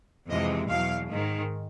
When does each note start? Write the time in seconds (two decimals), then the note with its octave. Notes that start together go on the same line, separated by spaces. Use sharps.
0.29 F2 C3 E3 G#3 D#5
0.68 E2 B2 F#3 F5
1.08 G#2 D#3 G#3